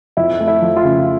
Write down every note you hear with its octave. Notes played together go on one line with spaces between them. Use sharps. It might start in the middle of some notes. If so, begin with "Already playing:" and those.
F2 E4
A3
E4
F3
F4
C#3